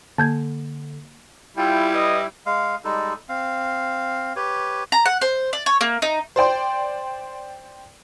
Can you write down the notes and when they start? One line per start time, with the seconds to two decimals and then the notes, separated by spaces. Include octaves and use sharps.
0.18 D3 A#3 A5 G6 G#6
1.57 G3 E4 F4 G5
1.93 B4 D#5
2.46 G#3 F5
2.84 G3 G#3 D#4 A4
3.29 C4 F5
4.36 G4 B4 C#5
4.92 A#5
5.06 F#5
5.21 C5
5.53 D5
5.66 C#5
5.81 A#3
6.02 D#4
6.36 C5 D5 G5 C6